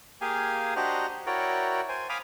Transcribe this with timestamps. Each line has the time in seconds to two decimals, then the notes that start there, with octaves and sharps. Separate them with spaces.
0.21 A#3 G4 G#4 F5 G#5
0.76 D4 F#4 G4 C5 D#5 A#5
1.26 E4 F#4 A#4 C#5 D5 G5
1.89 C5 G#5
2.09 F5 G#5 B5 D6 D#6 F6